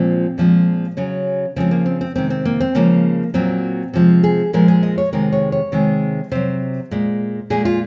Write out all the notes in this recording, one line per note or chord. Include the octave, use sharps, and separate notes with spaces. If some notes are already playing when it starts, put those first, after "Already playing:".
Already playing: A#2 F3 G#3 C4
A#2 F3 G#3
C#3 F#3 C#4
C#3 F3 G#3 C4
A#3
C4
C4
C3 D#3 G#3 C4
C4
A#3
C4
C#3 F3 G#3 A#3
A#2 F#3 C4
C3 F3 G#3
G#4
A#2 F3 G#3 A#4
G#4
D#5
C#5
C3 D#3 G#3 A#4
C#5
C#5
C3 D#3 G#3
C3 F#3 C5
A#2 G#3
A#2 G#3 G#4
F4